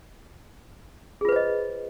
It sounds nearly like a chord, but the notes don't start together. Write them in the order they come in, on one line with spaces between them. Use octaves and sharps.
G#4 F4 B4 C5 D#5